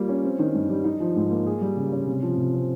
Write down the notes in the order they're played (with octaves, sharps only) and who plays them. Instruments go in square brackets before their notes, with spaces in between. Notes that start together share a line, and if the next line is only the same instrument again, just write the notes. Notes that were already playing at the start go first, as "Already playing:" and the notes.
Already playing: [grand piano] G3 A#3 F4
C#4
C4
D#3
G2
G3
D#4
F3
G#2
A#3
G#4
G3
C#3
C#4
C3
F3
C3
C4